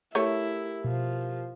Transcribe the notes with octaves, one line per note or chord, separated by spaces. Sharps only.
A3 E4 G4 A#4 C#5
B2 F3